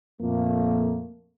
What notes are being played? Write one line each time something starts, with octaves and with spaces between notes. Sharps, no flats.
F2 A#2 A3 A#3